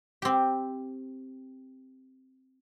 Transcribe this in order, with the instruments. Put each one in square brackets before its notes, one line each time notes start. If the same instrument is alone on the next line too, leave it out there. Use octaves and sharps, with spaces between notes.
[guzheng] C4 G4